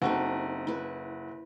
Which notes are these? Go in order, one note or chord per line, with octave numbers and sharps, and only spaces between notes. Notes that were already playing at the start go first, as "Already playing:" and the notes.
F#1 C4 D#4 F#4 A4
E4 B4